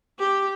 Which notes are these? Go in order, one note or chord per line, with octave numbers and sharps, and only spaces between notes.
G4